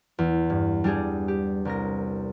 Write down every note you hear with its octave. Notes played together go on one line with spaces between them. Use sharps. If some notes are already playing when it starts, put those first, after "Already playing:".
E2
G2
G3 D4 G4 G#4
G4
C2 A#4 A#6